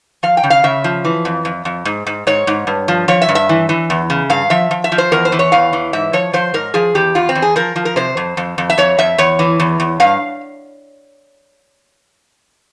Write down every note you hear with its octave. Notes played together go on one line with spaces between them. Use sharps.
F3 F5
G5
C#3
F5
C#3 E5
F3
E3
F2
F2
F2
G#2
G#2
G#2 C#5
G#2
G2
F3
F3 C#5
E5
G2
E5
E3
E3
E2
C#3
G2 F5
F3 E5
F3
E5
F3
C5
E2 A#4
C5
E3
C#5
E2 F5
E3
G#2 E5
F3 C#5
F3 C5
G#2 A#4
F3 G#4
E2 G4
E2 F4
C4
E2
G#4
F3 A#4
F3
A#4
C3 C5
F2
F2
F2
E5
F2 C#5
F2 E5
E2 C#5
E3
E2
E2
G2 F5